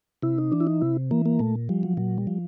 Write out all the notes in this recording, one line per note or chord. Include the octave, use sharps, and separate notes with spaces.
C3 E4
D#4
E3 D4
E4
D#4
C3 E4
E3 A#3
A#3
A#2 A3
F3 G3
F#3
A#2 F#3
G3
F3